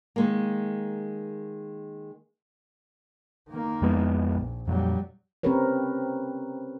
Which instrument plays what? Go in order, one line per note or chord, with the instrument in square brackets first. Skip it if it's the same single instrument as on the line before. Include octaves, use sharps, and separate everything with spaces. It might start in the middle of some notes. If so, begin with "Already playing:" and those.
[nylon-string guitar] D#3 G#3 A#3
[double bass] D#3 A#3
[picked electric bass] F2 G#3 B3
[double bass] A#1
[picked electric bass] F2 A#2 [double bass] F#3 G3
[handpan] C4 C#4 G4 A#4 B4 C#5